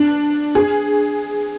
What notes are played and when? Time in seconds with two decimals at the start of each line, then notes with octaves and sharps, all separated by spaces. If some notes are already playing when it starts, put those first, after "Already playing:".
Already playing: D4
0.55 G#4